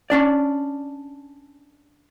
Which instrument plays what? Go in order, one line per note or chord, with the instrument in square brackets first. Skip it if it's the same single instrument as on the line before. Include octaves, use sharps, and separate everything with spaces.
[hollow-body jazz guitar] C#4 D4 D5